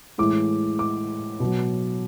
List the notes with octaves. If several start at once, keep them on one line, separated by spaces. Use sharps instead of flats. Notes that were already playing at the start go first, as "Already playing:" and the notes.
A2 E3 G#3 D6
D6
B2 F#3